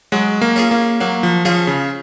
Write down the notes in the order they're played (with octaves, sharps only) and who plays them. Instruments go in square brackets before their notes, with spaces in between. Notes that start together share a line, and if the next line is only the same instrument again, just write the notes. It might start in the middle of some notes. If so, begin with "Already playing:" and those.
[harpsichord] F#3 [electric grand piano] G#3
[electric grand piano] A#3
[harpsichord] C#4 F4 G#4
[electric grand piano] A#3
[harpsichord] F#3 [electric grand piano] A#3
[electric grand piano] F3
[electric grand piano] F3 [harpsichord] C#4 F4 G#4
[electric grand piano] C#3